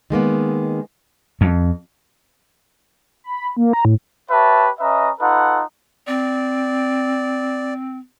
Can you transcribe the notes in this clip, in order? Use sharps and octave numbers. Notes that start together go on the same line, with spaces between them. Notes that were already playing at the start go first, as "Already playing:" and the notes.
D#3 G#3 A#3 B3
F2
B5
A#3
A#5
A2
G4 B4 C#5 E5 A5
C#4 B4 D#5 E5 A#5
D#4 F4 A4 B4 F#5
C4 D5